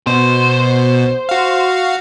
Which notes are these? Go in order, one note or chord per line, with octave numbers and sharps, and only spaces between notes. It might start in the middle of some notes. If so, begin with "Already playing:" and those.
B2 C5
F#4 F5